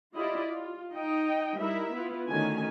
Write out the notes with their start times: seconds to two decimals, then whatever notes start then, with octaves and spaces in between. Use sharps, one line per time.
0.16 E4 F4 G4 D5 D#5
0.50 F4
0.93 D#4 D#5 G5
1.57 G3 D#4 E4 A#4 E5
1.92 B3 E4 F4 B4
2.28 D3 D#3 A3 C#4 F#4 G#5